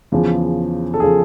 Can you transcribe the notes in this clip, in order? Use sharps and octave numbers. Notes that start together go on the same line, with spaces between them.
E2 C#3 F3
A4
C#3 F3 G#4